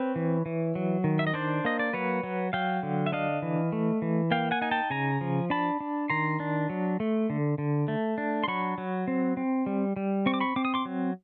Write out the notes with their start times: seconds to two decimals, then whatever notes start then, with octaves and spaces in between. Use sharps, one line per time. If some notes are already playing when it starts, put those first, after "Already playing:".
Already playing: C4 B4 C#5
0.16 E3
0.46 E3
0.75 F#3
1.04 D#3
1.19 E5
1.27 D#5
1.34 D4 C5 D5
1.65 A#3 D#5
1.79 D5
1.93 F#3 B4 C#5
2.24 F#3
2.53 F#3 F5 G5
2.83 D3
3.06 E5
3.12 D4 D#5 F5
3.42 E3
3.72 A3
4.02 E3
4.31 A#3 F5 G5
4.51 F#5 G#5
4.61 D#4 G#5
4.71 G5 A5
4.90 C#3 G#5 A#5
5.21 F3
5.50 D4 A5 B5
5.80 D4
6.10 D#3 A#5 C6
6.40 D4
6.70 F#3
7.00 A3
7.30 D3
7.58 D3
7.88 A3
8.18 D4
8.44 C6
8.48 F#3 B5 C#6
8.78 F#3
9.08 C4
9.37 C4
9.66 G3
9.96 G3
10.26 C4 C#6
10.34 D6
10.41 B5 C#6
10.56 C4 D6
10.65 D#6
10.74 C6 D6
10.85 F#3